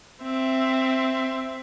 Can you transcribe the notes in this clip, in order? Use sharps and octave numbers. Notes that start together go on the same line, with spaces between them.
C4 E5